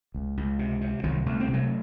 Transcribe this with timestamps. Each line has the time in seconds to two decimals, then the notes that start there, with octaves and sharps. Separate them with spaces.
0.14 C#2
0.37 C#2
0.59 C3
0.81 C3
1.04 C2 D#3 F#3
1.26 C2 A3
1.40 C4
1.48 C3
1.53 F#3 A3